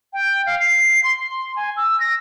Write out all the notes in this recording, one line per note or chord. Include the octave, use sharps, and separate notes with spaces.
G5
F5
C7
C6
G#5
E6
A#6